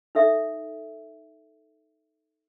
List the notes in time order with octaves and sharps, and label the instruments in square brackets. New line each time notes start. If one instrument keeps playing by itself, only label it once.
[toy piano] D#4 A4 E5